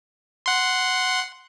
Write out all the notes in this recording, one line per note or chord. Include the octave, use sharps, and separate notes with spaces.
F#5 C6